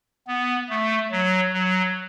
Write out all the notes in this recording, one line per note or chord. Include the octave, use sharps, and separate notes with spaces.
B3
A3
F#3
F#3